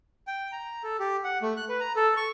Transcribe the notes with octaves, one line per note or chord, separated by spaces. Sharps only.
G5
A#5
A4
G4
F#5
A3
F#6
B4
A#5
A4
C#6